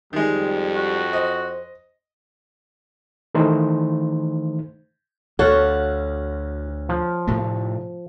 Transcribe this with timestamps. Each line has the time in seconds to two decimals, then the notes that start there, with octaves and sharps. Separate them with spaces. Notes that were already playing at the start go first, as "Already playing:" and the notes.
0.13 F2 D#3 G3 G#3
0.75 F#4
1.13 C5 D#5
3.35 D#3 E3 A3 D#4 C5
5.39 D2 F#4 A4 C#5 F5 F#5
6.89 F3
7.27 A2 C3 A3